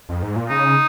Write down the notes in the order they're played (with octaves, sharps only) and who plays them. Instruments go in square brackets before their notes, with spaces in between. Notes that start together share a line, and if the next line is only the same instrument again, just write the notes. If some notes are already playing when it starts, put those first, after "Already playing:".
[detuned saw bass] F2
G#2
A#2
[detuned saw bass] C#3 [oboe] D#4